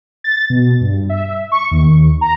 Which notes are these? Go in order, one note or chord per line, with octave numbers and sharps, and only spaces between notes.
A6
B2
G2
E5
C#6
D#2
A#5